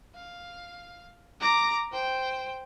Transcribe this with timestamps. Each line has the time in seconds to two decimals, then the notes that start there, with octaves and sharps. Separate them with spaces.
0.15 F5
1.40 A#5 D6
1.92 C5 G5